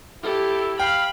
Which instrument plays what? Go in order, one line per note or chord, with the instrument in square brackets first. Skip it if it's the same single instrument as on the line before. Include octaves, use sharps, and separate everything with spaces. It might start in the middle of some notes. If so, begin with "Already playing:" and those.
[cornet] E4 [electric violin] G4 A4
[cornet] F5 [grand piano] G5 [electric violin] B5